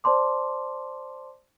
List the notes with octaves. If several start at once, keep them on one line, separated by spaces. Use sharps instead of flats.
C5 D5 A5 C6 D6